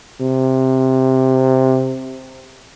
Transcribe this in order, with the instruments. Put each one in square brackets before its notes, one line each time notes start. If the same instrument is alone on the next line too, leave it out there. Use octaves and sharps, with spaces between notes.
[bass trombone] C3